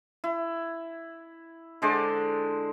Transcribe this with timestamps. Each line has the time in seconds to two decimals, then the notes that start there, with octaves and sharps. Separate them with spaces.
0.24 E4
1.82 D3 G#3 C5 D5